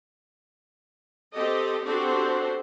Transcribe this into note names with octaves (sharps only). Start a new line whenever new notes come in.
C4 G4 A4 D#5
C4 D4 F#4 G4 A4 C5